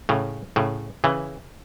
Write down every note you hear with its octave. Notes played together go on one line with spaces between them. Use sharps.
A2 C#3
A2 C#3
C#3 E3